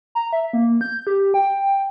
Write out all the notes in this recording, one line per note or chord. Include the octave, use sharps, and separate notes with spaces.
A#5
E5
A#3
G6
G4
G5